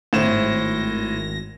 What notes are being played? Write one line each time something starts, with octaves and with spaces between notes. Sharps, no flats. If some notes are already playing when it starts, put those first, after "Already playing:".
G#1 A2 C5 A#6 E7